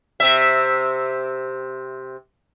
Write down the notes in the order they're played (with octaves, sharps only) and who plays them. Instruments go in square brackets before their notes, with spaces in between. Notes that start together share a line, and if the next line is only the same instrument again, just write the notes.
[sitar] C3 E5